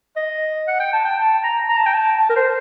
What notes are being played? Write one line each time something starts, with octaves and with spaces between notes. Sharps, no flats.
D#5
F#5
G5
A5
G5
A5
A#5
A#5
A5
G5
A5
A5
A#4
C5